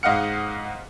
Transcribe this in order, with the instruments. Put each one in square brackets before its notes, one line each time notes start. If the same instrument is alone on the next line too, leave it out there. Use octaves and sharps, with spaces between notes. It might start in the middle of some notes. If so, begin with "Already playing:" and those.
[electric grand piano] G#2 D#5 F5 F#5 F6 C#7